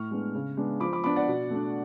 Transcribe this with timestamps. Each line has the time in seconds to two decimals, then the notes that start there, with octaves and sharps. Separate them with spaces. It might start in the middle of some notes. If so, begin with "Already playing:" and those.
Already playing: A2 C#6 F6
0.11 G#3 B3 D4
0.35 C#3
0.57 G#3 B3 D4
0.80 F3 B5 D6
0.93 B5 D6
1.04 B3 D4 B5 D6
1.16 D5 F#5
1.28 B2
1.51 A3 D4